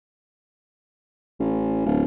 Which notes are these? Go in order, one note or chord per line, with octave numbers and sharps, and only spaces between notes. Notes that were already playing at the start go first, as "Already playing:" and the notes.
A1
D1